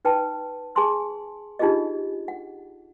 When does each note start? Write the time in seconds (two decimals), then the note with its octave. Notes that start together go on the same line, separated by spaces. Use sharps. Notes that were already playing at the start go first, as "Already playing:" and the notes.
0.05 D#4 B4 G5 A5
0.75 G#4 G#5 A5 C6 E6
1.59 D4 D#4 F4 G4 G#4 D#5
2.28 F#5